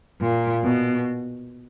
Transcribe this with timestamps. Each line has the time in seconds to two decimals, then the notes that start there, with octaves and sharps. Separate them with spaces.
0.21 A#2
0.64 B2